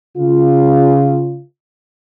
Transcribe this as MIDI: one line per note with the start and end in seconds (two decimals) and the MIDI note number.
0.17 1.42 49
0.17 1.42 65